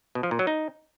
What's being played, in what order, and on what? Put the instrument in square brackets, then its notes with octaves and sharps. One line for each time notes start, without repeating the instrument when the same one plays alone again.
[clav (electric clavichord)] B2
F3
A#2
F#3
D#4